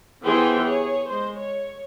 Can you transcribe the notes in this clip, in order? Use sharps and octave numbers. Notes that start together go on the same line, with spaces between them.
E3 B3 G4 G#4 C5 G5
G#4 C#5
G#3 C5
C#5